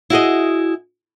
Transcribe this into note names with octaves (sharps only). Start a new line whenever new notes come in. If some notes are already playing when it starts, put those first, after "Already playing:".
E4 F#4 G#4 D#5